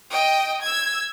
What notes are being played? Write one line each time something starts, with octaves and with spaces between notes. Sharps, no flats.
D#5 G5
E6 G#6